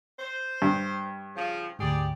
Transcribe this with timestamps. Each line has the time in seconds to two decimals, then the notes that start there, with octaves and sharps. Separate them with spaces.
0.19 C5
0.62 G2
1.35 C#3 F3
1.79 D2 G#2 G4 G#4 D5